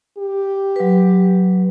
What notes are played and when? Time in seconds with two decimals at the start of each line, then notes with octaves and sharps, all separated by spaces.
0.18 G4
0.76 F#3 B4